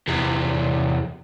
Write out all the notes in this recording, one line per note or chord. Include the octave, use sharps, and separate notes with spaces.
E2 C3